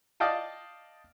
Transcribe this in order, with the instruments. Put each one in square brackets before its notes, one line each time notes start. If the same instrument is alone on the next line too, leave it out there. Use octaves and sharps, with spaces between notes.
[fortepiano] D5 D#5 F5 G5 A5